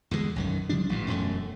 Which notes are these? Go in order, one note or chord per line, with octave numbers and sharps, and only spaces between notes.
E2 D3 D#3 G#3
B1 F#2 D#3
C#3 F3 G3 D4
A1 G2 A#2
E1 F#2 A3